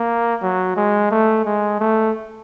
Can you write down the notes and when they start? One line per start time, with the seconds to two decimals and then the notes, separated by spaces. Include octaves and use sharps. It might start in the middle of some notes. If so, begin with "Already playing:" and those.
Already playing: A#3
0.42 F#3
0.76 G#3
1.11 A3
1.46 G#3
1.80 A3